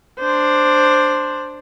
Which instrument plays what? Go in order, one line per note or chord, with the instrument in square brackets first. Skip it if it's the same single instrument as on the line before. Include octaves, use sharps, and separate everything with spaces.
[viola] D4 C5